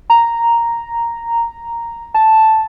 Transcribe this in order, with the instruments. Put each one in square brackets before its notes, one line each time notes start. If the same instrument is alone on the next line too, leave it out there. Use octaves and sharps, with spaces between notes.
[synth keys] A#5
A5